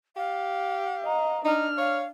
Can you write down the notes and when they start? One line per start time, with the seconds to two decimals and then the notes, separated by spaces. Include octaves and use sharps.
0.17 G4 F5
1.04 D#5 A#5
1.45 D4 D#4 F6
1.78 C#5 F5